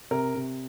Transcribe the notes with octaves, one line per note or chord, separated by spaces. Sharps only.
C3 A#4
C3